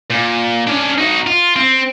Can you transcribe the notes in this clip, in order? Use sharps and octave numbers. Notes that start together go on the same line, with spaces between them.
A#2
C#4 D4
D#4 F#4
F4
C4